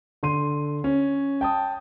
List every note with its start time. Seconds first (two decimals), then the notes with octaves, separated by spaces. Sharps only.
0.23 D3 C6 D#7
0.84 C#4
1.41 G5 A5 D#6